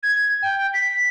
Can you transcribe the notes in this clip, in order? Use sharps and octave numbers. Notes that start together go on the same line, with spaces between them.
G#6
G5
B6